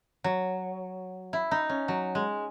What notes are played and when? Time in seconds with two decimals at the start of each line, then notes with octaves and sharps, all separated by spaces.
0.24 F#3
1.33 E4
1.51 D#4
1.69 C#4
1.88 F#3
2.15 G#3